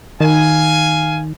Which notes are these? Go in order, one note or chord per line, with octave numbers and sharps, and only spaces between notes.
D#3 F5 G#5